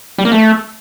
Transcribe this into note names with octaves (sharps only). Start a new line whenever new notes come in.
G3
A#3
A3